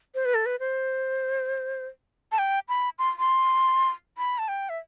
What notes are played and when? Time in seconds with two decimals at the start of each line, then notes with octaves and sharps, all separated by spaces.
0.15 C5
0.25 B4
0.34 A4
0.46 B4
0.60 C5
2.32 A5
2.38 G5
2.69 B5
2.99 C6
3.19 C6
4.18 B5
4.38 A5
4.48 G5
4.69 E5